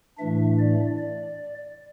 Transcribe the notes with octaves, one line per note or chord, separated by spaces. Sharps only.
A2 E3 A3 D4 E5
D5
D5